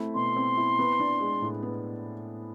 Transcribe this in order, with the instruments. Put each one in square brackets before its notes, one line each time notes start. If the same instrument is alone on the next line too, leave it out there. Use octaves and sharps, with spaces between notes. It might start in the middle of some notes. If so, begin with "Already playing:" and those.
Already playing: [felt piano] A3 C4 E4
[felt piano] B2 [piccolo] C6
[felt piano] C4
E4
B3
D4
G#3
A2
B3